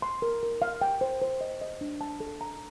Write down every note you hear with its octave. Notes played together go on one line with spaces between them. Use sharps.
C6
A#4
A#4
F5
G5
C5
C5
D#5
D#5
D4
A5
A4
A#5